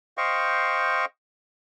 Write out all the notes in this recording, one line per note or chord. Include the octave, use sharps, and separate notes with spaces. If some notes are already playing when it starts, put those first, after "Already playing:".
C5 D#5 F5 G5 C#6